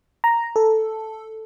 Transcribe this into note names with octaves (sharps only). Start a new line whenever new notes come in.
A#5
A4